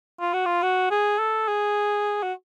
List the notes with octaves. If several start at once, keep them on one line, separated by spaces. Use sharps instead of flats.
F4
F#4
F4
F#4
G#4
A4
G#4
F#4